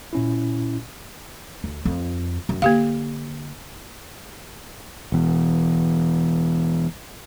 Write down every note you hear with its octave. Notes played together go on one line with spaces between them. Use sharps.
A#2 C#4 E4
D2
F2 F4
F#2
D3 A#3 G4 F5
E1 E2